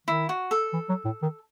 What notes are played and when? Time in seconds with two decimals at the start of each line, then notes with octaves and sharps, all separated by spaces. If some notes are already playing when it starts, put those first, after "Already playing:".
0.07 D#3 E4
0.29 F#4
0.51 A4
0.73 E3
0.89 F#3
1.05 A2
1.22 D#3